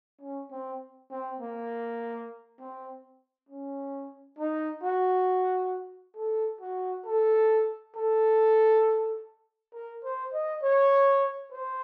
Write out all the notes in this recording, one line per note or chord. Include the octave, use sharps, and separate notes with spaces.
C#4
C4
C4
A#3
C4
C#4
D#4
F#4
A4
F#4
A4
A4
A#4
C5
D#5
C#5
C5